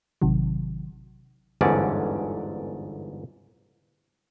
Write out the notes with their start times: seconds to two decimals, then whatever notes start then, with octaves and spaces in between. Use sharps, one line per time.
0.22 A1 C3 D#3 F#3
1.61 G1 E2 G#2 D3 C#4 D5